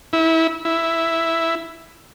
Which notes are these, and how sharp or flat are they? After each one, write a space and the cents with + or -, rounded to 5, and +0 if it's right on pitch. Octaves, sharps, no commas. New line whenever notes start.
E4 -25
E4 +0